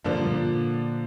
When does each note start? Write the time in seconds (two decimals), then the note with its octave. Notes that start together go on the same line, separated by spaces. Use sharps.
0.04 G2 D3 F3 A#3 D4
0.27 A#2